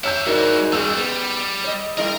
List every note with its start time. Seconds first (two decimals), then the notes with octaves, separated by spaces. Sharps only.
0.04 C#5 E5 F#5 E6 G6
0.27 G#2 G#3 D#4 E4 F#4 A#4 D5
0.73 G3 C#4 D#4 E6
0.97 G3 B3
1.64 C#5 D#5
1.98 G3 E4 A#4 D#5